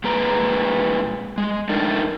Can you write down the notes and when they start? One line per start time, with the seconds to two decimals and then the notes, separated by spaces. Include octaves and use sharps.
0.04 A#2 G#3 B4 A#5
1.38 G#3
1.69 A3 D4 D#4 A#4